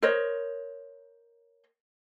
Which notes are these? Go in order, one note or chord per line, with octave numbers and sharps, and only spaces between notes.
A#4 C5 C#5 D#5